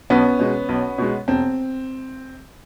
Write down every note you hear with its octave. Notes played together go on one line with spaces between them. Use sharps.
B1 B3 C#4
B2 G#3
B1
B2 G#3
E1 C4